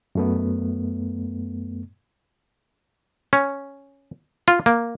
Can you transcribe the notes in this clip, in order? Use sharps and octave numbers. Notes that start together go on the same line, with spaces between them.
F#2 A3 B3
C#4
F4
A#3